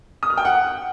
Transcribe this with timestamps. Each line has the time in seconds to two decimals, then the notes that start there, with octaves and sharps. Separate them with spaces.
0.23 D#6
0.30 F6
0.37 G5
0.45 F#5